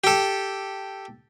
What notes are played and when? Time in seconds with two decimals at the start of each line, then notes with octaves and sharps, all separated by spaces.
0.04 G4 A4